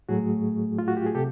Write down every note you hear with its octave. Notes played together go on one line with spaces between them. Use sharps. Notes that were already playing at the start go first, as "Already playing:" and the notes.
A2 F#3 A3 F#4 G#4
F4
F#4
G4
G#4
C3 G4 A4